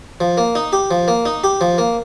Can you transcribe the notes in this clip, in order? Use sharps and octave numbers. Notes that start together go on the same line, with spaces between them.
F3
A#3
D#4
G4
F3
A#3
D#4
G4
F3
A#3